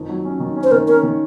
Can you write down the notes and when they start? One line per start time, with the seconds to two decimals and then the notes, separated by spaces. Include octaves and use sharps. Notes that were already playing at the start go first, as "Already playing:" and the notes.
Already playing: F2 D#3
0.09 F#3
0.25 C#4
0.40 D#3
0.56 C#4
0.64 C5
0.72 D#3 A#4
0.88 C#4 A#4
1.03 D#3